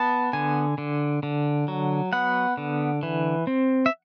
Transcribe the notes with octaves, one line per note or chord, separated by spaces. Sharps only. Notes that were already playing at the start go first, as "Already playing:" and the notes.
Already playing: B3 A5
D3 G#5
D3
D3
F#3
B3 F#5
D3
E3
C4
E5